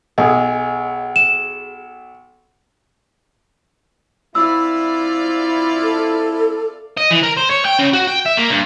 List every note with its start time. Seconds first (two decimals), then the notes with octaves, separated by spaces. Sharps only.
0.18 B1 G#4 D#5
1.16 E7
4.35 C4 E4 F4 D5 E6
5.82 A4
6.97 D#5
7.11 E3
7.23 A#4
7.37 C5
7.50 C#5
7.65 G5
7.79 C#3
7.93 F#4
8.07 G5
8.26 E5
8.38 A#3
8.51 G2